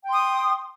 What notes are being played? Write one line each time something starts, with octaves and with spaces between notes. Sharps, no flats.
G5 C6 D#6